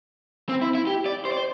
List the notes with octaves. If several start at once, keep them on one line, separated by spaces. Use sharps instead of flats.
C4
E4
E4
G4
D5
C5
D5
C5